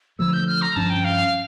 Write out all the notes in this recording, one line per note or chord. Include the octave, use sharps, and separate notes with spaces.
D3 F3 A3 E6
G6
F6
A#5
G2 F3 C#4 A5
G5
F5